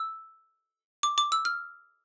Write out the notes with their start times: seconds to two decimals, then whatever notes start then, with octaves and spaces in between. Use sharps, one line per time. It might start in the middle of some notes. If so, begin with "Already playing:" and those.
Already playing: E6
1.03 D6
1.18 D6
1.32 E6
1.45 F6